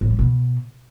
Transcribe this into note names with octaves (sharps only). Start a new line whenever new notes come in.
A2
G3
B2